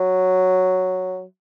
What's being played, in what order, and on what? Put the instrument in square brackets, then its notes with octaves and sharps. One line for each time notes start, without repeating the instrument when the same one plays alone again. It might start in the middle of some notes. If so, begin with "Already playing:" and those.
Already playing: [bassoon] F#3